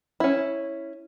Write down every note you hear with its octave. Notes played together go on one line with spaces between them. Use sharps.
C#4 E4